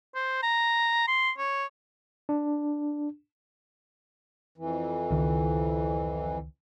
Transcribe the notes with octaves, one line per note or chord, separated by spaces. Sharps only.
C5
A#5
C6
C#5
D4
F2 E3
C#2 D#3